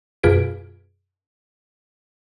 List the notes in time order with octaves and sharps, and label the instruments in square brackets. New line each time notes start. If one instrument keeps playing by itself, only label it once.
[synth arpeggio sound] F#2 B2 F4 G#4 B4 D7